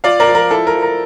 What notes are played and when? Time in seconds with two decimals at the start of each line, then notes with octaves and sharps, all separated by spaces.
0.04 F4 D5 F5
0.20 A#4 D5
0.28 F3
0.35 A#4
0.51 E4 A4
0.67 A#4
0.74 F3
0.82 A#4